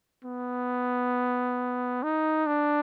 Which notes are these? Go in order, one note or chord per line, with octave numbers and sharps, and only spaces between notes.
B3
D#4
D4